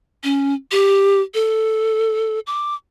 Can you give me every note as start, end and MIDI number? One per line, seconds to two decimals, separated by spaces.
0.24 0.54 61
0.72 1.21 67
1.34 2.40 69
2.47 2.74 86